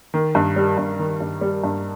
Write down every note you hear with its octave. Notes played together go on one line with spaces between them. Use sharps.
D#3
G2
G3
G2
D#3
G2
G3
G2